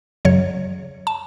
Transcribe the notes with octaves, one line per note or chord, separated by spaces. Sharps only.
F#2 C#3 F#3 C#5
A5